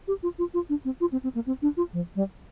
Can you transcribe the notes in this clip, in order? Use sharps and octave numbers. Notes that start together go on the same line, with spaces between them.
G4
F4
F4
F4
D4
C4
F4
C4
C4
A#3
C4
D4
F4
F3
G3